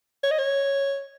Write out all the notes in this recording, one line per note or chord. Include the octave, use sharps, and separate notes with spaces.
C#5
D#5
C#5